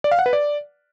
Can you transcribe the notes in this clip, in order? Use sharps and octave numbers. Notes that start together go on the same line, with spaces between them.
D5
F5
F#5
B4
D5